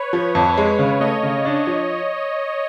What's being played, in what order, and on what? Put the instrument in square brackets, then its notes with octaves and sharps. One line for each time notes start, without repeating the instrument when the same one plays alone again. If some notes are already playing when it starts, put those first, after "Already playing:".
Already playing: [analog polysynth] B4 C#5
[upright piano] F3
F2
G#3
C#3
[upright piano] A3 [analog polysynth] C#5 D#5
[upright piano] C#3
D4
F3